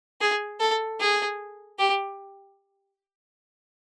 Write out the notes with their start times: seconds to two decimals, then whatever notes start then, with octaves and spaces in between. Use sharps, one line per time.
0.21 G#4
0.61 A4
1.00 G#4
1.79 G4